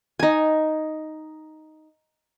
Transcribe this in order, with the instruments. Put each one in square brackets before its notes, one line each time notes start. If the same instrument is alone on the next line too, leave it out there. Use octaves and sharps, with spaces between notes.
[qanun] D#4 G#5